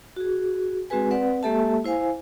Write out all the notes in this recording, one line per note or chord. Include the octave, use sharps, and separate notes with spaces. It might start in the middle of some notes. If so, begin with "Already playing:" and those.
F#4 G#4
G#3 C4 F#4 G#4 B4 G#5
C4 B4 D5 F#5
G#3 A#3 G4 A4 E5 A5
E4 C5 F5 G#5